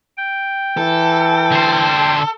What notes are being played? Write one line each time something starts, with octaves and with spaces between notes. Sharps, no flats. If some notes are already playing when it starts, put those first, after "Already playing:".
G5
E3 A4
D3 C5